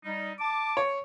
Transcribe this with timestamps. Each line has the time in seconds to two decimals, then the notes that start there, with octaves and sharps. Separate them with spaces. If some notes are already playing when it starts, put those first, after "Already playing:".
0.05 G3 D#4
0.40 A5 D6
0.77 C#5